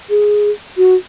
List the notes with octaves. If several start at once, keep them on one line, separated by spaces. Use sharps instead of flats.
G#4
F#4